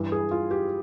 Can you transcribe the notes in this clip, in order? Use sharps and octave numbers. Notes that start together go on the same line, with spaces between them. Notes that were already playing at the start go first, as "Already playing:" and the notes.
Already playing: G2 E3
G#4
F4
G4